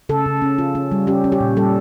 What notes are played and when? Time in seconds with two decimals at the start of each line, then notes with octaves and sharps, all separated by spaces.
0.09 C#3 A4
0.26 C#3
0.42 C#4
0.58 F4
0.75 C#4
0.92 G3
1.07 C#4 G4
1.24 C#4
1.32 G4
1.40 A#2
1.57 G3 A4